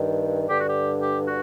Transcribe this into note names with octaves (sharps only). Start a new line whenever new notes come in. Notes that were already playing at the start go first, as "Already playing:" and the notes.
Already playing: G2 D#3
G2 D3 G4
F#4
G4
G4
F#4